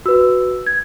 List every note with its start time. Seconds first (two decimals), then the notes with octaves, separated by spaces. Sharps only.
0.05 F#4 B4 E6
0.67 G#6